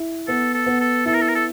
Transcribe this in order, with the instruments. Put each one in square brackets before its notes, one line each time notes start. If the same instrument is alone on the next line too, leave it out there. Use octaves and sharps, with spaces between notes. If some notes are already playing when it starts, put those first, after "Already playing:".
Already playing: [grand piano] E4
[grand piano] B3 [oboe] A4
[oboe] A4
[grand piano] B3
[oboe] A4
[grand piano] E4 [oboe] A4
[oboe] A#4
A4
A#4
A4